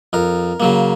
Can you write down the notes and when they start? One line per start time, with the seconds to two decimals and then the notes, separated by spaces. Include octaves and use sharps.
0.13 F2 A#4
0.60 C#3 F#3 A#3